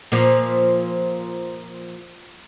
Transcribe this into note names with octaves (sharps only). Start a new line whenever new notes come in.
A#2 F3